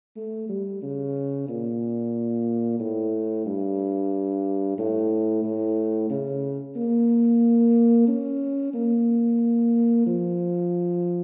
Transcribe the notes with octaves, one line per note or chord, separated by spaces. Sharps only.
A3
G3
C#3
A#2
A2
G2
A2
A2
C#3
A#3
C#4
A#3
F3